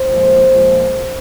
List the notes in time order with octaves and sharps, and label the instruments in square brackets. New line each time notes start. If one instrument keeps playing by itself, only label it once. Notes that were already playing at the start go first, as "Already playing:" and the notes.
Already playing: [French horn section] C5
A#2 F3 G#3
A#2 F3 G#3